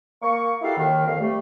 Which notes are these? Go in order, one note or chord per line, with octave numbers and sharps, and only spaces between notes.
A#3 C#6
D#4 E4 F#4 G4 A4 F5
D#2 D#3
F2 A#2 F5
G3 A3